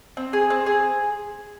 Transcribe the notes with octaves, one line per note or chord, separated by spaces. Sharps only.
C4
G#4
C4
G#4